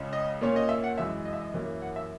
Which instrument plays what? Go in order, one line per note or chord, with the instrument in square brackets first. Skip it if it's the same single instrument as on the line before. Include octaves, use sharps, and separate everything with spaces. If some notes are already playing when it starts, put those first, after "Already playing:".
Already playing: [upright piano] C#2 C#3 G#3 C#4
D#5
A#2 A#3 C#4 C#5
D#5
E5
F#5
F#2 E3 G#3 E5
D#5
E5
D#5
F#2 E3 A#3 C#4
F#5
E5